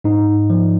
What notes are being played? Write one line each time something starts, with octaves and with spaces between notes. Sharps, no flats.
G#2 D#4
F3